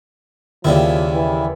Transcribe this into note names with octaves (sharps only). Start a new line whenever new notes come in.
D#2 C#3 F3 G3 E4
E3